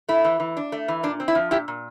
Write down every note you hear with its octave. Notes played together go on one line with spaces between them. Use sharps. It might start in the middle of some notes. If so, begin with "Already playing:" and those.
A3 E4
E3
E3
D4
A3
E3
A#2 D4
C4
E4
F3
A#2 E4 G4
A#2